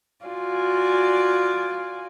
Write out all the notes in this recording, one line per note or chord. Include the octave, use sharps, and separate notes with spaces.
F4 F#4 D5 G#5